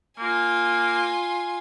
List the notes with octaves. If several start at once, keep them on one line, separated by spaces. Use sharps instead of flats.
A#3 F4 G#5